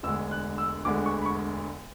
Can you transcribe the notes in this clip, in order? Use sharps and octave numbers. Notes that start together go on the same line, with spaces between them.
E1 D2 D3 G#3 E6
F#6
E6
E1 D2 D3 G#3 D6
C#6
B5
C#6